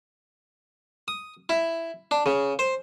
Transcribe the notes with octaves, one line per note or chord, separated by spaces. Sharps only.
D#6
E4
D4
C#3
C5